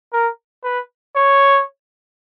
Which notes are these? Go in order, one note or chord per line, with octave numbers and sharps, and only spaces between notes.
A#4
B4
C#5